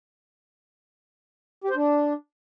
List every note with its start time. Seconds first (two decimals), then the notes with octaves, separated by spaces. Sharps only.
1.64 G4
1.70 C5
1.75 D4